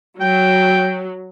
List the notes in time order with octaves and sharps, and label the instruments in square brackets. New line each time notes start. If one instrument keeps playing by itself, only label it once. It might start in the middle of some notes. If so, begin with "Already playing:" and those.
[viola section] F#3 [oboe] G5